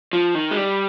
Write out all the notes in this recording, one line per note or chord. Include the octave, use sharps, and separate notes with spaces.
F3
D#3
G#3
G3